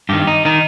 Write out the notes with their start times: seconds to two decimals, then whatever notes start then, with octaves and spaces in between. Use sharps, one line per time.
0.09 G2 D#3 G4
0.27 D#4
0.45 D#3 D#4